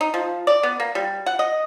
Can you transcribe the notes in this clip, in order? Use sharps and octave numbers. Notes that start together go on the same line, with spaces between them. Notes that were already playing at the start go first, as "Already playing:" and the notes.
D#4
F3
D5
B3
A#3
G3
F#5
D#5